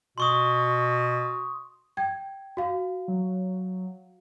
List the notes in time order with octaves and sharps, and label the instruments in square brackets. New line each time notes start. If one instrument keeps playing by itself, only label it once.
[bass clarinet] B2 [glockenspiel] C6 C#6 D#6
[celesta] G5 G#6
F#4 F5
[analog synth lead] F#3